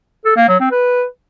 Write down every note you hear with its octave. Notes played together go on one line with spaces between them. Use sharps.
A4
A#3
F#3
C4
B4